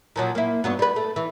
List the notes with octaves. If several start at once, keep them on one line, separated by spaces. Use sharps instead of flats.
A#2 F3 F#3
A#3 E4
G2 F#3 B3
G3 B4
A3
E3